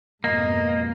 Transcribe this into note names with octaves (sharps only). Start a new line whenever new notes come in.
F2 G#2 B2 A#3 D#5